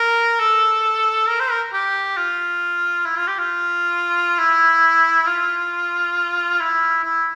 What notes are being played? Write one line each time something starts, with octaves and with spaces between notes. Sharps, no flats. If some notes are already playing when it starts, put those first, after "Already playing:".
Already playing: A#4
A4
A#4
C5
A#4
G4
F4
E4
F4
G4
F4
E4
F4
E4
E4